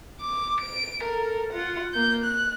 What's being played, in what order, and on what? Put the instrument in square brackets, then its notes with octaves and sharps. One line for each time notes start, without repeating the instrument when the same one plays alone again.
[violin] D6
D7
A4 A#4
F4 F#5
A#3 G6
F#6